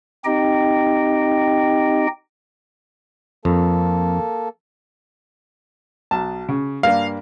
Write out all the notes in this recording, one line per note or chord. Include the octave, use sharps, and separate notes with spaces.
C4 D#4 G4 D#5 G5
F2 A#3 A4
B1 A5
C#3
G2 A#3 D4 F5